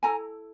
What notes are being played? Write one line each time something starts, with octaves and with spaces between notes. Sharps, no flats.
E4 A4 G#5 A#5